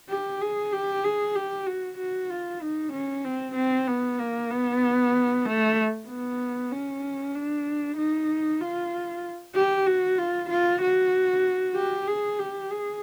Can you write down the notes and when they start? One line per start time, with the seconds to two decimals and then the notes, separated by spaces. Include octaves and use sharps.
0.09 G4
0.41 G#4
0.72 G4
1.04 G#4
1.35 G4
1.66 F#4
1.98 F#4
2.30 F4
2.62 D#4
2.93 C#4
3.24 C4
3.56 C4
3.88 B3
4.19 A#3
4.51 B3
5.46 A3
6.08 B3
6.71 C#4
7.35 D4
7.97 D#4
8.61 F4
9.56 G4
9.87 F#4
10.18 F4
10.50 F4
10.81 F#4
11.75 G4
12.07 G#4
12.39 G4
12.71 G#4